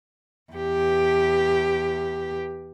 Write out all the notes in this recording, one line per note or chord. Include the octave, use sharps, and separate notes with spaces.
E2 G4